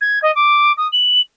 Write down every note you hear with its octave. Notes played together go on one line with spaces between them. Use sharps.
G#6
D#5
D6
D#6
F#7